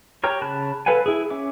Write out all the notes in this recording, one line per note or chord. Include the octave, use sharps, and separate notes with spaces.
G4 A#4 C#5
C#3 A5 B5 F#6
A4 B4 F5 F#5 G#5
E4 G#4
C#4 E5 D6